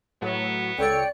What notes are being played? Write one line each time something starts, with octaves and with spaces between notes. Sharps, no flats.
A2 F#3 B3
C#2 A4 C#5 D5 G5 C#7